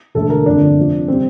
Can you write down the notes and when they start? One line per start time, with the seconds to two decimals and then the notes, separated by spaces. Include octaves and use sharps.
0.15 E1 D2 D3 A3 A4
0.30 A#4
0.45 G1 F2 D3 A3 D4
0.77 F2 C3 F3
1.08 C3 G3 C4